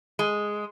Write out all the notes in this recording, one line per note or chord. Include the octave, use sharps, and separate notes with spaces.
G#3